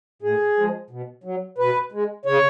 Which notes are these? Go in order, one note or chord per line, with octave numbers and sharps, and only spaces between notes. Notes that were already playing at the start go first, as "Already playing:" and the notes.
A2 G#4
F3 G#3
B2
F#3
B2 B4
G#3
C#3 C#5